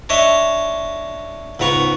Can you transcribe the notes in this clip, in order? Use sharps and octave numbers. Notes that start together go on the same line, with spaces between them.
D4 C#5 D#5 E5
C#2 G#2 B3 A#5 C#6